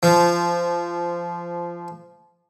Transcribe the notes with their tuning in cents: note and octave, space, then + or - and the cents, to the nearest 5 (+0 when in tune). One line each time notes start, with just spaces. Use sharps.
F3 -15